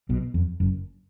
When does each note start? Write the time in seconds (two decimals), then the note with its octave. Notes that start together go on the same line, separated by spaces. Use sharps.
0.09 B1 B2
0.34 F2
0.60 F#1 F#2